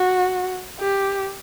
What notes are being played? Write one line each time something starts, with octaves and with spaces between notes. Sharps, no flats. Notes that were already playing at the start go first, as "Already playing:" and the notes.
Already playing: F#4
G4